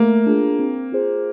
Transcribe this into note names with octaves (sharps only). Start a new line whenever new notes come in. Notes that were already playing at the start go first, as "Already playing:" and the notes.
Already playing: A3 A#3
D4 F4 G#4
C4
F4 G#4 C5